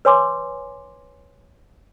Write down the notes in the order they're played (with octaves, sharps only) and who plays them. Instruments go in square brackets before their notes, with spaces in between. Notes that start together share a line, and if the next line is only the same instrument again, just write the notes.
[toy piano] B4 C#5 G#5 C6 D6